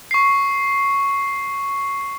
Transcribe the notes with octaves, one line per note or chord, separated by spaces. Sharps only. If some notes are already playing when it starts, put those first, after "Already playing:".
C#6 C7